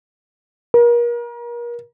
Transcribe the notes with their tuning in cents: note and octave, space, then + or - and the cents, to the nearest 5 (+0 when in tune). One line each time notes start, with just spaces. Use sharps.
A#4 +35